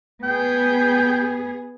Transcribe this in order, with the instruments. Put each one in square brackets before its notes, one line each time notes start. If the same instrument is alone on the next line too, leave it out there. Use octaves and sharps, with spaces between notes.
[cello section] B3 G#4 [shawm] G5